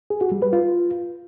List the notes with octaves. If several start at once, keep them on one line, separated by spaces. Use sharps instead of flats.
G#4
F#4
G3
B4
F4